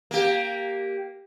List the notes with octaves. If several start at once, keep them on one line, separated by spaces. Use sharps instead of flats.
A#3 G4